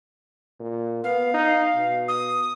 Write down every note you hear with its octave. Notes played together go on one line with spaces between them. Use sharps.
A#2
B3 F5
D#4
B2
D#6